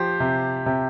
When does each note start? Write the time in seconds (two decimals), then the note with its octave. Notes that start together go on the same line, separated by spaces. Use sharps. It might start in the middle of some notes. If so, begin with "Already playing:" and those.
Already playing: F3 G4 C5
0.20 C3
0.66 C3